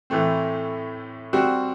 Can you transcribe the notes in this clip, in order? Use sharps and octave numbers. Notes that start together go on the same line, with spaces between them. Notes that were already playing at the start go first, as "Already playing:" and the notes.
A2 E3 A3 C4
G3 C4 F#4